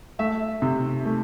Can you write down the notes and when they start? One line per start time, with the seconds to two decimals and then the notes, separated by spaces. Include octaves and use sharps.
0.19 A3 E5
0.62 C3
1.05 A3